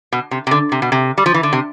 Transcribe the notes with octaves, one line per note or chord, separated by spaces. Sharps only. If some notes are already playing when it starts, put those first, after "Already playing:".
B2
C3
C3
D3
C3
B2
C3
G3
F3
E3
D3
C3